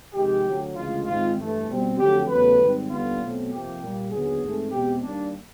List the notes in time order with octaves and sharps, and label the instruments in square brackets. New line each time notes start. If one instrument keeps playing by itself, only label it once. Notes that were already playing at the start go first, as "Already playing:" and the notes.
[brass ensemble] F2 C3 D#3 G#3 G4
D2 D3 F#3
D2 C#3 E3 G#3 F4
G#2 D#3 G#3 C4 F4
G2 E3 A3
B2 G3 C4
F2 D3 F#3 A3 G4
E2 C#3 F#3 A3 B4
G#2 D#3 G3 C4
D#2 D3 G3 B3 F4
B2 F#3 A3 C4
F2 C3 F3 A#3 G4
A#2 G3 A#3
D#2 D3 F#3 B3 G#4
G#2 E3 A3 C4
E2 B2 G#3 C4 G4
D#2 D#3 G3 A#3 D4